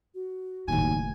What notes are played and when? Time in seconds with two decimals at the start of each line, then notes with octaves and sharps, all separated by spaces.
0.14 F#4
0.68 F#1 D#2 A2 G#5